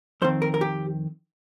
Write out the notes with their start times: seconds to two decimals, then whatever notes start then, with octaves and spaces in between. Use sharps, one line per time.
0.22 F2 D#3 C4 C5
0.42 A#4
0.54 A#4
0.61 G4